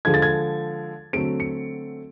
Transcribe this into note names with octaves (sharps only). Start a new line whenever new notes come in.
D3 F3 G#3 G#6
A6
G#6
D3 F#3 A3 C4 D7
C#7